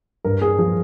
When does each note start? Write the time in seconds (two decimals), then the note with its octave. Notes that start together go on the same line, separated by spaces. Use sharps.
0.25 G2 A#4
0.42 G#4
0.59 F3 G#4